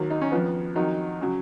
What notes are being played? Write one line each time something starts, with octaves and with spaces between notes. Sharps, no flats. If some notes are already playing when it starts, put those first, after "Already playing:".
Already playing: D#2 D#3 F#3
D#4
C#4
F2 F3 B3
F2 D#3 F#3 D#4
C#3 F#3